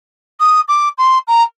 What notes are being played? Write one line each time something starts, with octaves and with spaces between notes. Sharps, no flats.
D#6
D6
C6
A#5